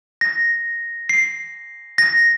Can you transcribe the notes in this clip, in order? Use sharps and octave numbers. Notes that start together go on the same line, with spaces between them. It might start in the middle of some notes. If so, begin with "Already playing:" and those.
A#6
C7
A#6